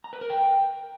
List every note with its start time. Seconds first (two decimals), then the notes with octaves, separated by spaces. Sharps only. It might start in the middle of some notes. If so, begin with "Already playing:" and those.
0.04 A#5
0.13 B4
0.21 A#4
0.30 G5